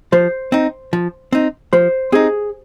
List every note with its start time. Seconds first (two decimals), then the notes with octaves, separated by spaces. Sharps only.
0.12 F3 C5
0.52 C4 D#4
0.93 F3
1.33 C4 D#4
1.73 F3 C5
2.12 C4 D#4 G#4